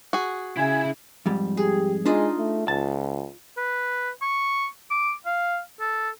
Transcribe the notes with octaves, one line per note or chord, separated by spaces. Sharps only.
F#4 G#4
C#3 E4 E5 G#5 G#6
F2 G#2 G3
G4 G#4
G#3 D4 D#4 F4 D#5
A3
C#2 A5
B4
C#6
D6
F5
A4